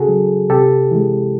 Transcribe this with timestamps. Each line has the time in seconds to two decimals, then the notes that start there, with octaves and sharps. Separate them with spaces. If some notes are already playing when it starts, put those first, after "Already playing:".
Already playing: C#3 F#4 G#4 A4
0.08 F#3
0.50 C3 G4 A4
0.91 E3 G#3